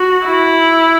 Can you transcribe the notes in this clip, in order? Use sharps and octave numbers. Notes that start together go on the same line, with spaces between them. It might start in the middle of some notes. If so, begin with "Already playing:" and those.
Already playing: F#4
E4